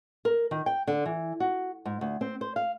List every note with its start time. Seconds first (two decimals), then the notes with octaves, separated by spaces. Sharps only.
0.25 A#4
0.51 D#3
0.66 G5
0.87 D3
1.06 E3
1.40 F#4
1.85 G#2
2.01 D2
2.21 C4
2.41 C5
2.56 F5